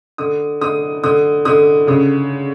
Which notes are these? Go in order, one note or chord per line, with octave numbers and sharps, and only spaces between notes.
D3 D#6
D3 D#6
D3 D#6
D3 D#6
C#3 D#6